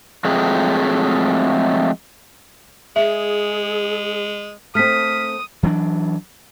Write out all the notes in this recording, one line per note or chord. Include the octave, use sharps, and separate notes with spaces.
F3 F#3 G#3 A3 C4 G#4
G#3 G#4 E5
A3 C4 D#6 F6 B6
E3 F#3 A#3 D4